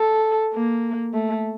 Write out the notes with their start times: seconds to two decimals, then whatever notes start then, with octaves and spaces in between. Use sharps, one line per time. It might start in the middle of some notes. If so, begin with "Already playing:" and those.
Already playing: A4
0.54 A#3
1.14 A3